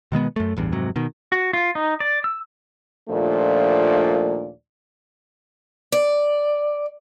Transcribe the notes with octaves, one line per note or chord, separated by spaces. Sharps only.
B2 D#3 G#3 B3
F#2 A3
A1 E2 G2
F1 G#2 C3 F#3
B2 D#3
F#4
F4
D#4
D5
E6
D#2 A#2 F3 A3 D4 D5
D5